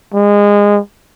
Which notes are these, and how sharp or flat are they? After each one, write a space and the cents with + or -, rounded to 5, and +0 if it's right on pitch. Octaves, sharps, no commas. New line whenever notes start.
G#3 -25